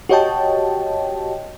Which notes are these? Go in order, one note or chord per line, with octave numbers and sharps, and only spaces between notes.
F#4 G4 C#5 D#5 G5 A5